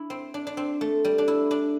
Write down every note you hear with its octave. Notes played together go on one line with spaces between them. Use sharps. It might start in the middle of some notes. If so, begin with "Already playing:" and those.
Already playing: D4 E4
C4
D4
D4
C4
A3
G3
D4
E4
D4